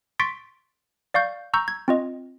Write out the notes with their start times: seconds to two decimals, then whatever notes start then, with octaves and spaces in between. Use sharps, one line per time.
0.19 C6 C#6 A6 B6 D7
1.14 D5 F5 C#6 G6
1.54 A#5 C#6 E6 G6
1.68 G#6
1.88 C4 F4 D#5